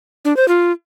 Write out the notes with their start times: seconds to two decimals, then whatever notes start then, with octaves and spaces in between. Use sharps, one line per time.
0.25 D4
0.37 C5
0.48 F4